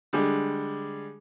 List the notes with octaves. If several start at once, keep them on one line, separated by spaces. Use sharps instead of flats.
D3 G3 G#3